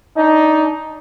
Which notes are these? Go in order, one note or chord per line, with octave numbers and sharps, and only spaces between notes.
D4 D#4